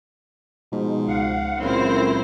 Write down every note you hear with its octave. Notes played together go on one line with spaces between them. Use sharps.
G#2 B2 F3 G#3
C#2 F5 F#5
C#2 A#2 F#3 A3 C4 E4 A#4 C5